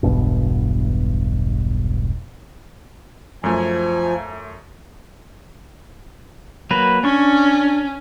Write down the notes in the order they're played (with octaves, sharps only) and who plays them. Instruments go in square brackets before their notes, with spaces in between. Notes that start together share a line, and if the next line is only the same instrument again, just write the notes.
[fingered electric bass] E1 B1 G2 B2
[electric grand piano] F#2 A3 [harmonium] F3 G#5
[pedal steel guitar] F#3 A#3 B4
[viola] C#4 [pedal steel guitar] D4 C#6